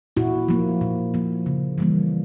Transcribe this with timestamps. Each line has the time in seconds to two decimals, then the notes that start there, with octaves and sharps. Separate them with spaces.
0.17 A#2 E4 F#4
0.48 F3 A#3
0.81 A#2
1.14 F3 A#3
1.46 C#3
1.78 E3 G3 A#3